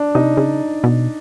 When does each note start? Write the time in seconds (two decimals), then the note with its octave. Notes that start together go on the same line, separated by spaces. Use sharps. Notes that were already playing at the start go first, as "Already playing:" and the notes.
Already playing: D4
0.15 C3 D#4
0.37 C#3
0.84 B2